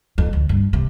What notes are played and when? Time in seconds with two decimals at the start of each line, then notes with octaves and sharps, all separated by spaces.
0.18 F2
0.33 D2
0.49 G2
0.73 C3